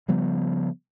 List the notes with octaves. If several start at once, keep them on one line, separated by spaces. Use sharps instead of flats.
C#3 F3 G3 B3